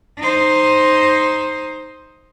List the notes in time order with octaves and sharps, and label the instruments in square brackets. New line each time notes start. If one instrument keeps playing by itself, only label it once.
[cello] D#4 C5